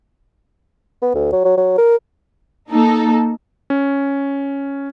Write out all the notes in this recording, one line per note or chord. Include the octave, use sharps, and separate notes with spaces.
B3
D2
F#3
F#3
F#3
A#4
A#3 D#4 A4
C#4